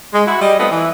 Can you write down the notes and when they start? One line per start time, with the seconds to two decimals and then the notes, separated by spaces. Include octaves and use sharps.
0.13 G#3
0.26 E4 F#4
0.41 G3 D#5
0.58 A3 B3 C4 F4 D#5
0.71 E3